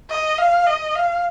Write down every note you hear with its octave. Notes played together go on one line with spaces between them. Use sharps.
D#5
F5
D#5
F5